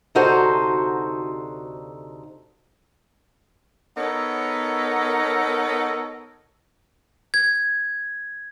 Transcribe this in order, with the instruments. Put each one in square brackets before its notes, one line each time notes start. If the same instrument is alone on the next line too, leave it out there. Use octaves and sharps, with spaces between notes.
[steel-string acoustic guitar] D2 C3 D#4 F#4 A4 C5
[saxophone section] B3 D#4 A4 A#4 C#5
[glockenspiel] G#6